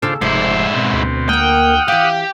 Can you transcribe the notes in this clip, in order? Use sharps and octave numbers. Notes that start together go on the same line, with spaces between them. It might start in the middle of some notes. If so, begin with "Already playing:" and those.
D#2 C#3 D4 F4 A4 C5
F1 G#2 E4 C5 D5
B2 C4
D2
A#3 A#4 F#5 G5 D#6 F6
E3 G4 F5